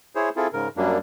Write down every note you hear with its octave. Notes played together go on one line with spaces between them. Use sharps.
E4 G#4 C5 C#5
C4 E4 F4 G#4 A4
G#2 C#3 A#4
F#2 F#3 G3 A#3 D4